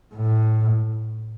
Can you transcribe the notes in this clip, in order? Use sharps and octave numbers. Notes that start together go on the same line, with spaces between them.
A2